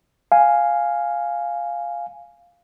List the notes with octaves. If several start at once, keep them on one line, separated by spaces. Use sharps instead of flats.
F5 G#5